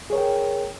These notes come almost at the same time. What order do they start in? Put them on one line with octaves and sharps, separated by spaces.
G#4 C#5 A#4 G5